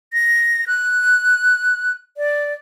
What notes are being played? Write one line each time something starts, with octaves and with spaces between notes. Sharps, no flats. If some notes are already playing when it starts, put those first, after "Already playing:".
A#6
F#6
D5